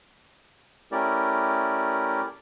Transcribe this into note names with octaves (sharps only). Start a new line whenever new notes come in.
A3 C#4 E4 G4 A#4 D5